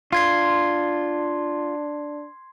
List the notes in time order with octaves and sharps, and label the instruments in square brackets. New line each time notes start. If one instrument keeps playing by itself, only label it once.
[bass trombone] D4 [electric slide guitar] F4 [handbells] C6 G#6 C7